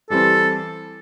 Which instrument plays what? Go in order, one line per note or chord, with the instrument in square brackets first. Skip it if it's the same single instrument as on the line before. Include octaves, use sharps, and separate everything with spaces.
[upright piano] E3 G3 C4 [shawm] A4